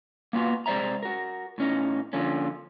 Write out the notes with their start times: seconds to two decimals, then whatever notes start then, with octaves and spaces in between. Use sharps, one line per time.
0.33 A#3 B3 F4 F#4
0.66 C3 G#3 C5 D5 E5 A#5
1.03 F#4 A#4
1.58 A2 C#4 D#4
2.13 D3 F3 A#3 C#4